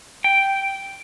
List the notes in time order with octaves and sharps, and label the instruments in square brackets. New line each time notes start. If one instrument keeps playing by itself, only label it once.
[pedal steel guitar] G5